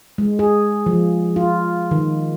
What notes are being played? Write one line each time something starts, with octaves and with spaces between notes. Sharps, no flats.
G#3
G#4
F3
F4
D#3